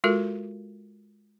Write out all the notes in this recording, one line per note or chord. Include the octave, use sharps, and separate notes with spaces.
G#3 F4 F#4 A4 A#4